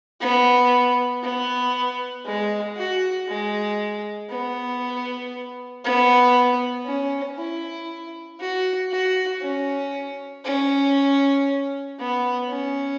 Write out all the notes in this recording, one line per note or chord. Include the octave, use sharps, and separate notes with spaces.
B3
B3
G#3
F#4
G#3
B3
B3
C#4
E4
F#4
F#4
C#4
C#4
B3
C#4